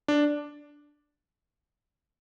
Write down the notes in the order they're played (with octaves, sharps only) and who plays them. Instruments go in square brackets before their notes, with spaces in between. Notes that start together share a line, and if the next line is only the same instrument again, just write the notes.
[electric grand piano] D4